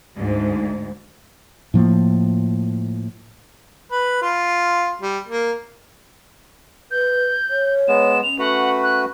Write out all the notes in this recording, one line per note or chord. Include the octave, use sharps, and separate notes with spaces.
D2 G#2
A2 F3 A#3
B4
F4
G3
A#3
B4 G6
C#5
G#3 B3 E7
C#4 F7
A3 F#4 B4 F#5
F#6